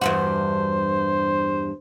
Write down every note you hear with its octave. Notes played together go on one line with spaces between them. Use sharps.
E2 G2 F#4 C5